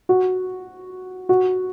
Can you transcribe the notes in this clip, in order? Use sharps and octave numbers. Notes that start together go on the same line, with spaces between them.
F#4
F#4